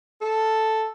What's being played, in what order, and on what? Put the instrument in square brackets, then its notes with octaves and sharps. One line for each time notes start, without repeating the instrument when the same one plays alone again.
[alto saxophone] A4